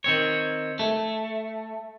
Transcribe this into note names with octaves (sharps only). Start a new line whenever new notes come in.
D#3 C4 C#5
A3